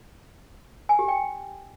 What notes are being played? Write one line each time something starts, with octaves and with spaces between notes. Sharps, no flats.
G#5
G4
G5